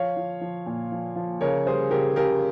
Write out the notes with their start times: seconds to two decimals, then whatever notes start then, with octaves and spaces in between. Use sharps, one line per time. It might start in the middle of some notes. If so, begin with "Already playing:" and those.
Already playing: F3 C#5 F5
0.17 F3
0.41 F3
0.66 A#2
0.92 F3
1.16 F3
1.41 C#3 A#4 C#5
1.66 G3 G#4 C5
1.91 C#3 G4 A#4
2.16 C#3 G4 A#4